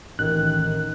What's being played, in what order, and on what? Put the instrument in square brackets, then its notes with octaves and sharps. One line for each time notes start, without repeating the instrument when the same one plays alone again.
[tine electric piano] A1 [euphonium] D#3 [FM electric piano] F#6